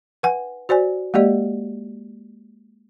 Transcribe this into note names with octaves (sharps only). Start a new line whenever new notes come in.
B4 F#5 G#5
F#4 C5 D5 G#5
G#3 A#3 G4 D5 D#5